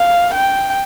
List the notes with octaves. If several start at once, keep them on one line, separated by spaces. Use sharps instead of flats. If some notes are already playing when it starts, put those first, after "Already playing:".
Already playing: F5
G5